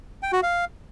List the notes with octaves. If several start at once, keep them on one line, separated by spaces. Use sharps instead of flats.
G5
F#4
F5